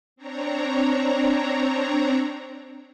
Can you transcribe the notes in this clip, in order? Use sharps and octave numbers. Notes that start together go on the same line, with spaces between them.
C4 D4 C#5 A#5